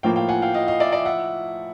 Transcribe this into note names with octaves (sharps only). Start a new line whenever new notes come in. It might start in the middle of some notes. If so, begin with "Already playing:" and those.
A2 F3 A#3 F5 G5
F5 G5
F#5 G#5
F5 G5
D#5 F5
D#5 F5
D5 E5
D5 E5
E5 F#5